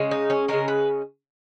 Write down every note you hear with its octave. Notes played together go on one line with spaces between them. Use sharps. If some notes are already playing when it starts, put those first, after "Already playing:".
Already playing: C#3 G#3 C#4
D#4
C#4
C#3 G#3 C#4 A#4
B4